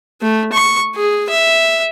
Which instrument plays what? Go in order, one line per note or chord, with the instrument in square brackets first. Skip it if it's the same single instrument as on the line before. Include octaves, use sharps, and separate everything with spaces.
[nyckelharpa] A3
C#6
G#4
E5